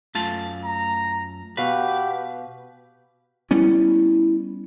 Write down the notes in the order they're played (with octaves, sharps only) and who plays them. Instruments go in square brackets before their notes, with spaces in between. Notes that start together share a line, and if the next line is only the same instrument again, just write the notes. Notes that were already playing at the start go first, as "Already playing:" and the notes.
[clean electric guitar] F#2 A3 A5 [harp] F4
[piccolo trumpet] A#5
[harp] B2 F#4 F5 [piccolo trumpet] G4 [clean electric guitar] B4
[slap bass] G3 B3 C#4 [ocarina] E4